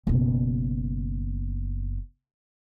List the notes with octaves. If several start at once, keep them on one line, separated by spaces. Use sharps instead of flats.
F#1 B2